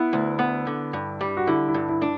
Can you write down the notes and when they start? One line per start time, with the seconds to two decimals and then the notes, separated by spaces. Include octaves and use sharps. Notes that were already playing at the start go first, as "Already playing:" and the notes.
Already playing: B3 E4
0.13 D2
0.39 B3
0.67 D3
0.93 G2
1.21 G3
1.37 F#4
1.47 D3 E4
1.68 E4
1.74 G2
1.89 E4
2.02 D4